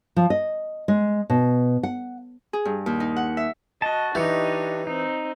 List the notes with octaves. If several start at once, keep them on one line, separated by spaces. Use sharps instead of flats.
F3
D#5
G#3
B2
F#5
G#4
G2
D#2
D#4
F#5
E5
F#4 D#5 A5
E3 D4 D#4 G4 C#5 D#5
C4 D#4